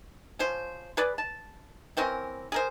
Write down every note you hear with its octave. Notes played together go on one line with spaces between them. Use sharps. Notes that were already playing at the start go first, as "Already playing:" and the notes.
F3 C#4 C5
G#4 B4 D5
A5
E3 C4 C#4 A#4
G#4 A#4 C5